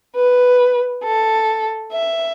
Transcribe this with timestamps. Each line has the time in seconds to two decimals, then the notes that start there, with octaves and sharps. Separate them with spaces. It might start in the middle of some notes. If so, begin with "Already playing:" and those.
0.15 B4
1.04 A4
1.92 E5